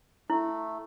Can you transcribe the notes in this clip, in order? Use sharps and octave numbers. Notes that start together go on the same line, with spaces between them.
A3 E4